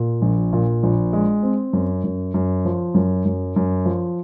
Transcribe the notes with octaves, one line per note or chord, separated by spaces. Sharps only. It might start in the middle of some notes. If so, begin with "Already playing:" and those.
Already playing: A#2
A#1
A#2
A#1
G#3
C4
F#2
F#2
F#2
F3
F#2
F#2
F#2
F3